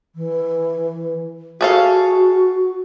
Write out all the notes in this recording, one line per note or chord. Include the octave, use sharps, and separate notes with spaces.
E3
F#4 G#4 A4 F5